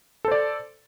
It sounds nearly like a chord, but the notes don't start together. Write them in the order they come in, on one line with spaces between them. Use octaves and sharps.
A4 C5 D5